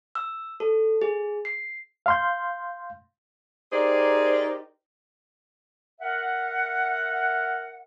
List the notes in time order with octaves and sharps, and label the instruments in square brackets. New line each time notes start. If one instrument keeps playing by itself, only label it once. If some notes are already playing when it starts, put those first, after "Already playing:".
[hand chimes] E6
A4
G#4
C7
[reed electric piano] F5 C6 G6
[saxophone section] D#4 G4 G#4 A#4 C5 D5
[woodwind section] A#4 E5 F#5